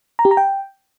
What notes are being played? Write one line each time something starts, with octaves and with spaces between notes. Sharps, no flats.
A#5
G4
A#5
G5